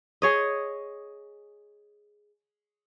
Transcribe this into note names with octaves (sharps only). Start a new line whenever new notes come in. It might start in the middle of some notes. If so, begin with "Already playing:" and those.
G#4 C#5 D#5